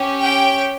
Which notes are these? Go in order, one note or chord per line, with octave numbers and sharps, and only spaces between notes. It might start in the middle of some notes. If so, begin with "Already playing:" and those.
Already playing: C#4 G4
G5